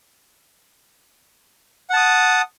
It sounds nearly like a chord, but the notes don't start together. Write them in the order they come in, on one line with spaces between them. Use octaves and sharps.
F#5 A5 D#6